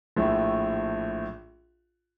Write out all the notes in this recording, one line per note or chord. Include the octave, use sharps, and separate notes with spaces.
A#1 A2 A3